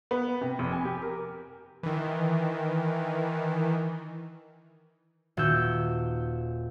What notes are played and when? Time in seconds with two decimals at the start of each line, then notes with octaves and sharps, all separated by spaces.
0.11 B3
0.41 C3
0.59 F1
0.73 G#5
0.85 G4
1.03 A#4
1.83 D#3 E3
5.37 D#1 F#4 E6 G6